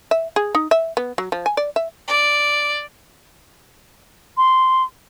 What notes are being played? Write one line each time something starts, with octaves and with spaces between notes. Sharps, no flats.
E5
G#4
D#4
E5
B3
F#3
F3
G#5
D5
E5
D5
C6